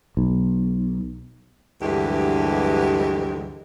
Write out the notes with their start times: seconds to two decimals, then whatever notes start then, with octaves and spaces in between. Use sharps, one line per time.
0.17 B1
1.80 D2 G2 E3 F#3 G#3 G4